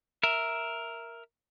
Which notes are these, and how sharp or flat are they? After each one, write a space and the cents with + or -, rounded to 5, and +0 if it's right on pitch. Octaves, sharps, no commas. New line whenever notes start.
A#4 +0 E5 +0